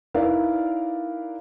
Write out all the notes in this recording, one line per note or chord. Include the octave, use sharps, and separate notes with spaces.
D#4 E4 A#4 B4 D5 F5